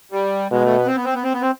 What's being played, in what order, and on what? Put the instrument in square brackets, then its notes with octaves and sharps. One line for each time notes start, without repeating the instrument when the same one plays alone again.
[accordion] G3
[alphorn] B2 [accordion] G#3
[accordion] A3
B3
C4
B3
C4
B3
C4
B3
C4